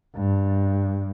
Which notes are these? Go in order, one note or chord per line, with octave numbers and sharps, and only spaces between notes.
G2